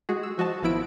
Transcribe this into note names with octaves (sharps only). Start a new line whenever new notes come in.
G#3 F#4 G#4
E6
F3 F#4 D#5 A5
G#1 F3 B3 E4 E6 D7